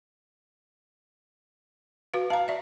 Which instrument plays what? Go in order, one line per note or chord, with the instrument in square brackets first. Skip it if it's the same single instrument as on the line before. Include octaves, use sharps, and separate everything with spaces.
[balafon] F#4 B4 F5
[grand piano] F5 [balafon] A5 A#5
[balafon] D5 E5